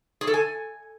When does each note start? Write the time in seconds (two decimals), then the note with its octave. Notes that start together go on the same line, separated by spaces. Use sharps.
0.21 G#4
0.27 A4
0.34 G#5